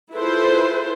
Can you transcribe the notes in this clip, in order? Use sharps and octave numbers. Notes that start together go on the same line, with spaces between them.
E4 F4 G#4 A4 B4 C5